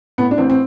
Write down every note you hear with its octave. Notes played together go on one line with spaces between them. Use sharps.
A2 B3
D4
A1 C4
C4